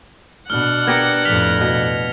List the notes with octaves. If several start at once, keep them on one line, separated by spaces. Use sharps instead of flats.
B2 D4 F#5 F6
B3 G4 A#4 G#6 A#6 C#7
F2 A2 F6 B6 F7
B2